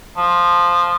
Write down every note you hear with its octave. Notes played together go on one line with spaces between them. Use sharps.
F3